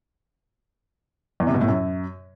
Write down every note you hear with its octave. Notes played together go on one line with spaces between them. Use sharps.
E2
C3
B2
A2
F#2